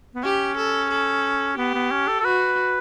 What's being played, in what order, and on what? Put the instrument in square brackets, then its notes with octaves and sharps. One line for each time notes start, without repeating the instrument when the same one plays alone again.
[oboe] B3
[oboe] C#4 [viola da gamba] G4
[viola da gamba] A4
A4
[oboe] B3 [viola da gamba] G4
[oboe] B3
C#4
A4
A4
[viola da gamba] F#4 [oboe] B4